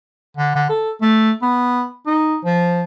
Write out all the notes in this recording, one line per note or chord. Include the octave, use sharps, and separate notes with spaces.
D3
D3
A4
A3
B3
D#4
F3